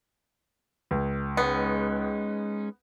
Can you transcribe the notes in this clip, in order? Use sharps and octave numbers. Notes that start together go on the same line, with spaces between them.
C#2
G#3 B3 C#4 D#4